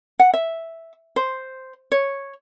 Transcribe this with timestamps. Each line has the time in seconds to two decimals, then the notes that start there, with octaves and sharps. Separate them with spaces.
0.19 F#5
0.34 E5
1.16 C5
1.92 C#5